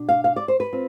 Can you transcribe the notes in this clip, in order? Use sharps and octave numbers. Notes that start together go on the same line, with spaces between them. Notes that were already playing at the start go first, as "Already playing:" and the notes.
Already playing: B2 D4
F5
F5
D5
C5
B4
C4 F4